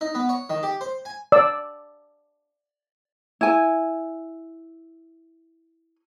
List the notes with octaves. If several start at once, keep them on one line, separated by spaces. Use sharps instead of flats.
D#4
B3
C#5
D#3
G4
C5
G#5
D5 E6
E4 G#5